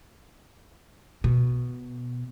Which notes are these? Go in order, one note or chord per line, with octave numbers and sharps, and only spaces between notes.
B2